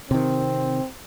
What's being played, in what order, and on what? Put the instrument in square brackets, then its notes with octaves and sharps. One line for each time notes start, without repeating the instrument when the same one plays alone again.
[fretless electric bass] C3 D#3 [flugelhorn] C4